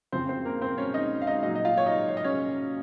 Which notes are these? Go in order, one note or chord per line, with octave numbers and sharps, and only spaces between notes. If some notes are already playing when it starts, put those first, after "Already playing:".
F2 C#3 F3 C4 C5
C4 C5
A#3 A#4
C4 C5
C#4 C#5
D#4 D#5
F5
D#4 D#5
A#2 F#3 D#4 D#5
D#5
F4 F5
C#5
D#4 D#5
C#5
D#5
C#4 C#5